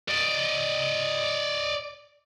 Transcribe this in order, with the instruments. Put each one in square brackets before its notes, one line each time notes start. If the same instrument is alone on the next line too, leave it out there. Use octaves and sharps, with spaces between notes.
[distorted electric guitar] D5 D#5